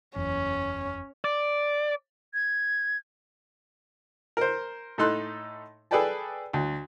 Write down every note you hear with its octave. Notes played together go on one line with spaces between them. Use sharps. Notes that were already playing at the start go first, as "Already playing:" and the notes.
F#1 E2 C#4
D5
G#6
A#4 C5
A2 A3 D#4 A4 C6 F#6
G#4 A4 B4 D5 G5 A5
D2